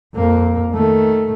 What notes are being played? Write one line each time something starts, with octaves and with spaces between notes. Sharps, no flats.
F2 A#3
D#3 A3